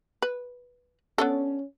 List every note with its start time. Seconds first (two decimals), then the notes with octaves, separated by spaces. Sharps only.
0.22 B4
1.18 B3 C#4 D4 A4